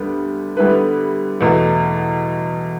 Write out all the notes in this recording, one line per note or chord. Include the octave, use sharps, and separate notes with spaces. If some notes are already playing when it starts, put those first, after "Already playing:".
Already playing: D2 D3 G3 B3
D3 G3 B3 E4 B4
E2 B2 A3